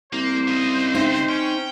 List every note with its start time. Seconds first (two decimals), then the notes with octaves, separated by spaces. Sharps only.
0.13 C2 A#3 C5
0.48 C#3 D#5
0.95 C4 D#4 E5
1.29 C#4 G5